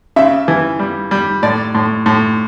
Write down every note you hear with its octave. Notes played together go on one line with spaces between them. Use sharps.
C#3 E5
E3
G3
G3
A2 D5
A2
A2